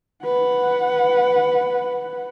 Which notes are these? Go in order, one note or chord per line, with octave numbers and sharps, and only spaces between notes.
B4 F#5